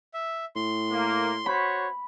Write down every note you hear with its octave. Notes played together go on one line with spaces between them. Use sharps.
E5
A2 C6
A#3
F#4 C5 C#5 B5